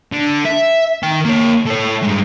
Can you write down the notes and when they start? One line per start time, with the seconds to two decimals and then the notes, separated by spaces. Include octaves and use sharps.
0.12 D3
0.45 E5
1.03 D#3 G5
1.25 A#3 C#5
1.66 A3 C#5
2.03 G2 G#3